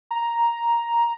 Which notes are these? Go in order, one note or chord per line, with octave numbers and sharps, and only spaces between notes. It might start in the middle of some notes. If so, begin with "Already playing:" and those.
A#5